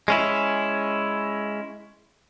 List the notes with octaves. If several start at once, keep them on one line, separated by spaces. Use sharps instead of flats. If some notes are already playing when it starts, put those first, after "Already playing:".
G#3 C#4 E4